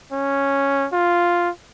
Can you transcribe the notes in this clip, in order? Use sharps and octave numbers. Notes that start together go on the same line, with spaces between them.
C#4
F4